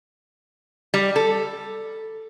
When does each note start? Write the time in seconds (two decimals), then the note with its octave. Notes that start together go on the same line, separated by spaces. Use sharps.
0.94 G3
1.16 A4